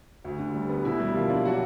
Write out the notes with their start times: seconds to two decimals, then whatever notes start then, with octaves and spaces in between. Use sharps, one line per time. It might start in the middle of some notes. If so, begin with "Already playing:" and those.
0.24 D2
0.39 D3
0.55 G3
0.69 B3
0.85 B2 E4
1.00 G3
1.14 F3 A#3 F4
1.30 D4
1.45 F#3 F#4